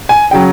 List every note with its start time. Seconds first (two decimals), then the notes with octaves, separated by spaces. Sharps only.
0.09 G#5
0.31 C#3 F#3 G5